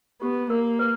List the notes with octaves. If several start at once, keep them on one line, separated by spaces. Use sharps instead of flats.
B3 G4
A#3 A#4
B4